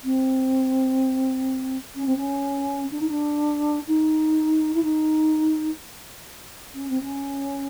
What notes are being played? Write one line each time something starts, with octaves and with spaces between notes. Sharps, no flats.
C4
C#4
C4
C#4
D4
D#4
D4
D#4
E4
D#4
C#4
C4
C#4